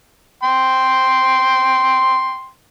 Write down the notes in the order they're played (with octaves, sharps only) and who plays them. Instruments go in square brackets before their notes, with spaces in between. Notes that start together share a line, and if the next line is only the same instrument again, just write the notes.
[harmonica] G5 C6